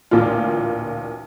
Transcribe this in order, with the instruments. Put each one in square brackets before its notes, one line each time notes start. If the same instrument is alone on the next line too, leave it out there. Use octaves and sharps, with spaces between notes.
[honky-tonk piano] A1 D2 A#2 F4